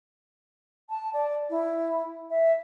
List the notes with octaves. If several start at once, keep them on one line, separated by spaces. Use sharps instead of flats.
A5
D5
E4
E5